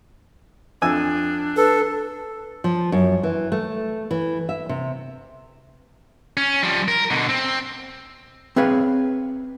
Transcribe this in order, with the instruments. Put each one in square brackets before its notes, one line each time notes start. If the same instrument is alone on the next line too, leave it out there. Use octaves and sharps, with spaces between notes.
[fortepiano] F2 G#5 E6 [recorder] D4
[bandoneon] A4 [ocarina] B4
[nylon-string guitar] F3
F#2
E3
A3
E3
E5
C3
[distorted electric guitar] C#4
F3 G3
A#4
B2 D3
C4
[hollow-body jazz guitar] C4 G#4 B4 C#5 F5